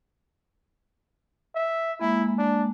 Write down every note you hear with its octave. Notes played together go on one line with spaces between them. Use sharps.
E5
G#3 A#3 E4
D4